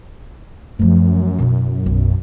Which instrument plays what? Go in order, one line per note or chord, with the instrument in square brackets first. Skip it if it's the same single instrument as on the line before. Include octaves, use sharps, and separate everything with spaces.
[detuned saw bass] F#2 [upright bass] F3 A3
[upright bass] B2 E4
B1